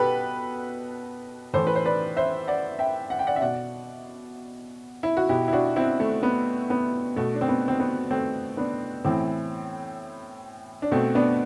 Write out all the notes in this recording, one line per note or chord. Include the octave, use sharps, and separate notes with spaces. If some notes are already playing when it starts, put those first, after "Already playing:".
Already playing: B2 G4 A4 B4
A2 E3 A4 C5
B4
C5
B4 D5
C5 E5
D5 F#5
E5 G5
F#5
G5
D5 F#5
E5
B2 D5 F#5
E4
F#4
B2 E4 G4
E4
D4 F#4
C4 E4
A3
B3
B3
B2 A3
D4
C4
B3
C4
B3
A3 C4
B3 D4
A2 E3 C4 E4
D4
B2 A3 C4
B3 D4